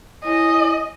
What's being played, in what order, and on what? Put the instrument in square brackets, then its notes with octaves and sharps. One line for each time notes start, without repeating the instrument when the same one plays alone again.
[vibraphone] E4 C#5 G#5 [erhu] D#5